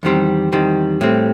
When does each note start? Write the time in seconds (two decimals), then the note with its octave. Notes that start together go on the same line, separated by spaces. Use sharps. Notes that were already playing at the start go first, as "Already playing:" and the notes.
0.03 E2 D#3 G3 C4
0.52 E2 D#3 G3 C4
1.01 A2 G3 C4